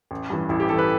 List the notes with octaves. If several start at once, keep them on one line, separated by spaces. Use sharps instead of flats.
A1
G2 E3
A1 E4
G4
G2 E3 A4
B4